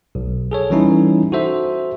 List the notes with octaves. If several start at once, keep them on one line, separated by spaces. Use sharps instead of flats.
B1
G#4 A4 C#5
E3 G3 C#4 D#4 E4
F#4 A4 C5 E5